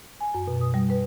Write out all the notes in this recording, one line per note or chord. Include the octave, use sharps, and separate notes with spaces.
G#5
F#2
B2
D#6
G3
B4